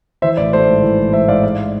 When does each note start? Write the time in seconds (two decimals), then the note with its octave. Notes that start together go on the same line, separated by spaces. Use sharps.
0.22 E3 C5 E5
0.37 A1 D5
0.53 A3 C5
0.68 G#2
0.83 E3
0.98 A1
1.13 A3 C5 E5
1.28 G#2 D5 F5
1.43 G#3 D5